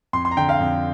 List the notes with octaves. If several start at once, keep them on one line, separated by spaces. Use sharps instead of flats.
F2 C6
C6
A#5
D3 G5
F5
F2